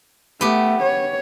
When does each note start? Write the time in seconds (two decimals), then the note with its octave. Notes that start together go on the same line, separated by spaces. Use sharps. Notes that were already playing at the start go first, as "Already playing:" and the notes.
0.41 A3 B3 G4
0.83 C#5